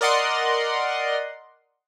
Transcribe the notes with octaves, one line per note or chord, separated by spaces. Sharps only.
A#4 D5 D#5 F#5 C6